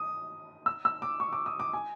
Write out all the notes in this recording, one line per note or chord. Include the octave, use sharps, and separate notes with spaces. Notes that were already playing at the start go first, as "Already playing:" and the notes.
Already playing: D#6
E6
E6
D6
C#6
D6
D#6
D6
G#5